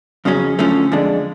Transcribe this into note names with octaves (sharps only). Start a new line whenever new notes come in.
F2 C#3 F#3 C#4
D3 F3 A3 C#4
F2 D3 G#3 D4